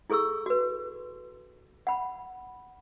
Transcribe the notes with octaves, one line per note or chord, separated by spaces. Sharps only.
E4 G#4 A4 C#6 E6
F#4 B4
F#5 B5